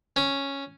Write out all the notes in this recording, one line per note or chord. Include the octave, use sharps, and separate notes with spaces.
C#4